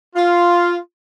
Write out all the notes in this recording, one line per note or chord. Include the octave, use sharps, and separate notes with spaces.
F4